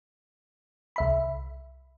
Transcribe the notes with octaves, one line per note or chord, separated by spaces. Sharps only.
C2 E5 B5